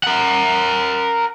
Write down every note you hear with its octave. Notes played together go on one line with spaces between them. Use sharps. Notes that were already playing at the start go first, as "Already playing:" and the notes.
A#4 F#5